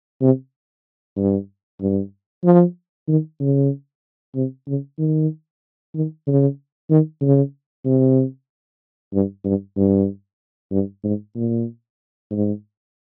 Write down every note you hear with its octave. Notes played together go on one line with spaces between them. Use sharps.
C3
G2
G2
F3
D#3
C#3
C3
C#3
D#3
D#3
C#3
D#3
C#3
C3
G2
G2
G2
G2
G#2
A#2
G#2